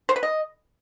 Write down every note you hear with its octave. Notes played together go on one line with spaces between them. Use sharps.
C5
B4
D#5